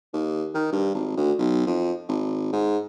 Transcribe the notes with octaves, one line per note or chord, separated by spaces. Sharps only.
D#2
D#3
G2
G#1
D2
B1
F2
G#1
G#2